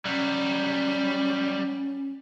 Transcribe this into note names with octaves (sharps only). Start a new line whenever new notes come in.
F#3 G3 C#4